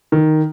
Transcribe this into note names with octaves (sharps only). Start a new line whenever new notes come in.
D#3